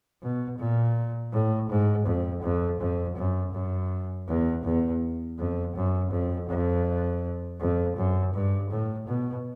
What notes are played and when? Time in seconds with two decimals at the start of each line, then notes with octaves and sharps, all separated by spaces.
0.22 B2
0.59 A#2
1.33 A2
1.69 G#2
2.06 F2
2.43 F2
2.80 F2
3.17 F#2
3.53 F#2
4.28 E2
4.64 E2
5.39 F2
5.76 F#2
6.12 F2
6.49 F2
7.60 F2
7.97 F#2
8.34 G2
8.70 A2
9.07 B2